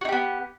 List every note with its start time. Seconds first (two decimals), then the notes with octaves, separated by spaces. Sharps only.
0.01 F#4
0.05 D#4
0.09 G4
0.12 B3